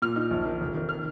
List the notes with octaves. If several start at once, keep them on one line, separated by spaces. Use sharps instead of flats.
A#2 F6
D#4
A#1
D#3
F1
D#3
F6